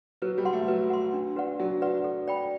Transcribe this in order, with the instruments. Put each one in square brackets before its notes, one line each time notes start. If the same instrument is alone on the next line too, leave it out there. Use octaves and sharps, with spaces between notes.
[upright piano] F#3 [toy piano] B4
[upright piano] G3
[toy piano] F#5 C6
[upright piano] A3
[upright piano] F#3 [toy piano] B4
[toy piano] F#5 C6
D4
F#4 B4 D5 F#5
[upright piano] F#3 [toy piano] D4
[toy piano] F#4 B4 D5 F#5
A4
D5 G5 B5